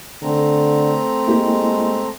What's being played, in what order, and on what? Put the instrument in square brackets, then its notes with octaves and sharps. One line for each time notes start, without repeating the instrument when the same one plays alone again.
[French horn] D3 [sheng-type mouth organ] A3 C4 A#5
[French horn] G#3 [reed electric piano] A#3 E4 G4